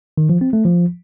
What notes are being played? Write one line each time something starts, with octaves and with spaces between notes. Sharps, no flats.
D#3
F3
C4
A3
F3